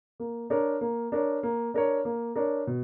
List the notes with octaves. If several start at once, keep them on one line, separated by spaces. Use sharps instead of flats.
A#3
D4 A#4 C#5
A#3
D4 A#4 C#5
A#3
D4 A#4 C#5
A#3
D4 A#4 C#5
B2